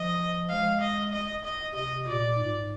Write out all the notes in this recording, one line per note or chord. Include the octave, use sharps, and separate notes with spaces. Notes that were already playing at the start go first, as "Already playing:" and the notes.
Already playing: F3 D#5
G#3 F5
D#5
D#5
D#5
C3 D#5
A#2 D5
G#2